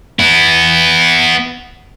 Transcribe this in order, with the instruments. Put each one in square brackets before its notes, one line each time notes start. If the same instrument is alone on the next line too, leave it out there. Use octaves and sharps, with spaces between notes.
[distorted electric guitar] B3 E4